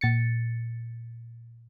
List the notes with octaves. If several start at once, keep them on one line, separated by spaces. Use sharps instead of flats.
A#2 A6 C#7